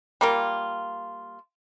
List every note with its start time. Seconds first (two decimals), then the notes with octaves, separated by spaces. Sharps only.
0.21 G3 A#3 F4